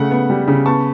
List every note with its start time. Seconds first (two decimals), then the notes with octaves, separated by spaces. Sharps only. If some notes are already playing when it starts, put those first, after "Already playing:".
Already playing: C#3 A3 F#5
0.11 B3
0.30 G3
0.48 C#3
0.66 B3 A5 C#6